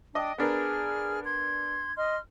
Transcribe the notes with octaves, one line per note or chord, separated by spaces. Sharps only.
D4 D#5 G5 D#6
B3 D4 G#4 A#4 F6
C6 G#6
D#5 C6 F6